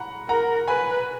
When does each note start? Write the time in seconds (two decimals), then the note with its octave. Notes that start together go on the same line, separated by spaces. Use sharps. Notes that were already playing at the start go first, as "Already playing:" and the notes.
Already playing: F#5 A#5 B5
0.29 A#4 F#5 A#5
0.68 B4 G#5 B5